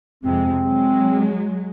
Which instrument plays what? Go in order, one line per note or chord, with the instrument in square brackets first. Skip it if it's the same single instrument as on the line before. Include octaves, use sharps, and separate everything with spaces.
[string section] F2 C3 G#3 [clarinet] C4
[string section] F#3 G#3